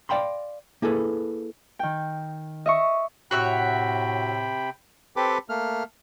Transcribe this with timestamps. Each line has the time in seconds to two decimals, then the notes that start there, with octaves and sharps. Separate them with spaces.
0.09 D5 F5 G5 B5 C6
0.82 A#3 E4 G#4 A4 B4
1.79 D#3 G5
2.66 D#5 E5 C#6
3.31 A2 C3 F#4 C#5 E5 G5 B5
5.16 C4 G4 A4 B4 D6
5.49 A3 A#3 F6